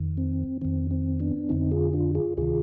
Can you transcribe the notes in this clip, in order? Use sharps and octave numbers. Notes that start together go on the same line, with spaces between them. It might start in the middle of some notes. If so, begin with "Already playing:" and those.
Already playing: F2 D#3
C4
F2 D#3 C4
C4
B3 D4
F2 D3 C4 D#4
F4 G#4
D4 F4
F4 G#4
D2 C3 D#3 F4 G#4